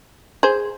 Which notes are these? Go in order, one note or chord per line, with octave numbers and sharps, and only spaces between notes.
G#4 C5